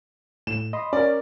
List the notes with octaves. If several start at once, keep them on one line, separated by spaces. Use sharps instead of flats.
A2 E7
D#5 B5 C6
C#4 A#4 D5